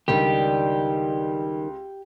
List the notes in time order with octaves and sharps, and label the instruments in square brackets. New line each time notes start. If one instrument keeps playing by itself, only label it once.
[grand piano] C#2 [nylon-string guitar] D#3 G3 D4 [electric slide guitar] G4